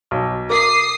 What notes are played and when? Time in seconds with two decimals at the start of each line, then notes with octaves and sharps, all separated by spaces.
0.11 B1
0.50 A#4 D6 D#6 C7